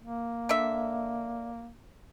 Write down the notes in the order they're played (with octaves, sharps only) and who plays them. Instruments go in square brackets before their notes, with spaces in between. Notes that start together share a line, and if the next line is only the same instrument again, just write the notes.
[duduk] A#3
[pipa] D3 E5